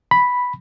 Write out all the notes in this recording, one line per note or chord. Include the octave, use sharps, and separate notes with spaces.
B5